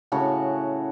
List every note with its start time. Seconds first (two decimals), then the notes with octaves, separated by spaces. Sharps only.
0.12 A2 C#3 F#4 A5